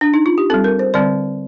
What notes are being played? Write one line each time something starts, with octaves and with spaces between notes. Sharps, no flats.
D4
D#4
F4
G4
G3 C4 A4
A#4
C5
D3 G3 C4 D5